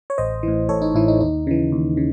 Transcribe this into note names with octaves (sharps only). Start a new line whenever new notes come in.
C#5
A1 C5 D#5
A2 E3
A1 A4 C#5
D#4
A2 E3 E4
D#4
D#2 D#4
C#3 E3
D#2
C#3